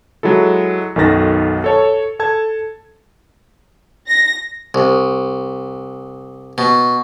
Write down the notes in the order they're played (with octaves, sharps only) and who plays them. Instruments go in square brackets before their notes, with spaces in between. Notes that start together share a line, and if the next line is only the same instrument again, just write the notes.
[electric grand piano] F#3 G#3 E4 A4
B1 F#2 D#3 A4 A6 A#6
A4 C#5 A5
A4 A5 G#6
[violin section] A#6
[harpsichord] C2
B2